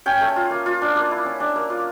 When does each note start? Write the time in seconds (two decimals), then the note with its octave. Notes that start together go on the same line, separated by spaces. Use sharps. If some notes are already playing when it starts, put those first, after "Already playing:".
0.06 C#4 G5
0.21 A3
0.29 G#5
0.36 F4
0.51 A#3
0.66 F4
0.82 D4
0.96 A#3
1.11 E4
1.26 C#4
1.40 D4 A5
1.56 A#3
1.70 F4